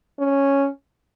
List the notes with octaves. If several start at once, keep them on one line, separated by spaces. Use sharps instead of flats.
C#4